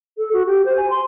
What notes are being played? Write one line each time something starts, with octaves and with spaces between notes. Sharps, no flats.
A4
F#4
G4
C5
G#5
C6